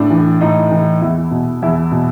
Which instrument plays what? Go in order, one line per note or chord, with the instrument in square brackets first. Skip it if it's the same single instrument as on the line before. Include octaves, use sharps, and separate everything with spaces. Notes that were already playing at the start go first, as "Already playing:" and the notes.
Already playing: [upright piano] A2 D4
E3
A2 D#4
E3
E2 E4
B2
E2 E4
B2